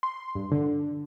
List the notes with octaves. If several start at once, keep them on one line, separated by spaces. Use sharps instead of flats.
C6
G2
D3